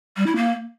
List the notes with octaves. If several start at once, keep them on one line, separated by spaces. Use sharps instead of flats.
G3
E4
A#3